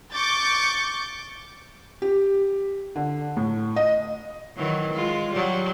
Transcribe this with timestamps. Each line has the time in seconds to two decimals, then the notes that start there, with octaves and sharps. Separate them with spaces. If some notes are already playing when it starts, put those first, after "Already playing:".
0.13 C#6 D6 G6 A6
2.02 G4
2.96 D3
3.37 A2
3.76 D#5
4.57 D#3 E3 F#3
4.93 G#3 F4
5.32 F#3 G3